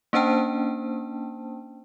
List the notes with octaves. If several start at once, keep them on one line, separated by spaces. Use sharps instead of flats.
A#3 C#4 D4 C5 G5 A5